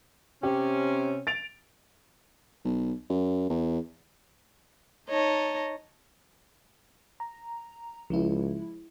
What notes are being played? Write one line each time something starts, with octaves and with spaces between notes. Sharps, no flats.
C3 C#4 G4
A6 D7 F7
B1
F#2
E2
D#4 C#5 D#5 A5
A#5
C#2 F3 G#3 E4